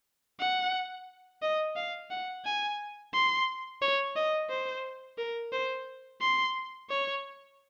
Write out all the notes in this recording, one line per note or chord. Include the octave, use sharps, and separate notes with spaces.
F#5
D#5
F5
F#5
G#5
C6
C#5
D#5
C5
A#4
C5
C6
C#5